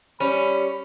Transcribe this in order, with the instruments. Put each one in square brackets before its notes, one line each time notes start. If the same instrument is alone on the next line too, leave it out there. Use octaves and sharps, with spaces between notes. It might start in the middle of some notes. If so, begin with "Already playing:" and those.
[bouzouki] G3 C#4 [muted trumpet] B5